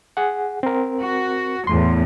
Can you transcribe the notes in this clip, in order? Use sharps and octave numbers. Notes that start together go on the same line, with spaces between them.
G#4 F#5
C4 A#4
F#4
E2 A2 C6